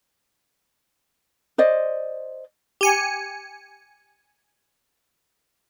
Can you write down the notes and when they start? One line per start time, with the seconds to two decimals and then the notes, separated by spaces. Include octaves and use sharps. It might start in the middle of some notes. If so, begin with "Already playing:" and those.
1.58 C5 D5 D#5
2.81 G4 G#5 C#7